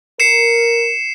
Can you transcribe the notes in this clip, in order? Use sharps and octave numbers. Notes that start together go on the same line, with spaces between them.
A#4 C7 C#7 E7